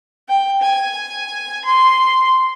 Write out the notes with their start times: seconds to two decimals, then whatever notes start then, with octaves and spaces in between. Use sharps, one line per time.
0.28 G5
0.61 G#5
1.65 C6